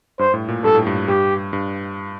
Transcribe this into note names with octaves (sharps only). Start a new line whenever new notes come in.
G2 C5
A2
A#2
G2 A4
A2
G2
G2 G4
G2